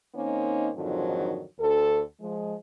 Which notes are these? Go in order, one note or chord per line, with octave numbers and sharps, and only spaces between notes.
D#3 A#3 C4 C#4 D#4
F2 G#2 D3 D#3 F3 F#3
D2 A4
F3 G#3